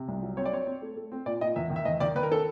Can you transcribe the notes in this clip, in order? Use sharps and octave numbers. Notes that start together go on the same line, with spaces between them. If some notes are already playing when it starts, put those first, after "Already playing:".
Already playing: C3
C2
F#3
C4 C#5
D5
C4 C#5
C4
A3
A3
C4
A#2 D5
A#2 D#5
E2 E5
D#3
E5
E2 D#5
D#3 D5
D#3 B4
A#4
A4